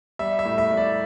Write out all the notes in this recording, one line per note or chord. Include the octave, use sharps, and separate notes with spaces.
G3 E5
E5
A2
E5
G3
D5